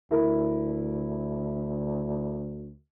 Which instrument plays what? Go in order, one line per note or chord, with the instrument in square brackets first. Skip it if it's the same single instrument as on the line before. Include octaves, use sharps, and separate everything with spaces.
[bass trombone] D2 [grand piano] E4 A#4